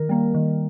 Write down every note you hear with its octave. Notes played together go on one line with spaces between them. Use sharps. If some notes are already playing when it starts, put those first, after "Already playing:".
Already playing: D#3 A#4
G3 A#3
D#3